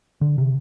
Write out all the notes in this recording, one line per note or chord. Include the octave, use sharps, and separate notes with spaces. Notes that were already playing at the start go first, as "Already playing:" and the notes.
D3
C3